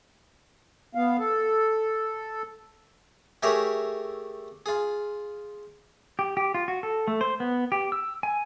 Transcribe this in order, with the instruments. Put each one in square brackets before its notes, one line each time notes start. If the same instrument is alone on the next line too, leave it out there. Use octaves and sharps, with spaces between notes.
[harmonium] B3 F5
A4
[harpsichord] A3 G4 G#4 A#4 C#5 E5
F4 G#4
[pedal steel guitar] G4
G4
F4
F#4
A4
A3
C5
B3
G4
E6
G#5